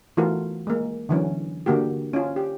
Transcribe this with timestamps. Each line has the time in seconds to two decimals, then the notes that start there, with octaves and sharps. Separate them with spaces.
0.17 E3 A3 F4 F#4 A#4
0.67 G#3 A#3
1.09 D3 E3 F#3 C#4
1.66 D3 A#3 F#4 G4
2.13 C#4 F4
2.36 G4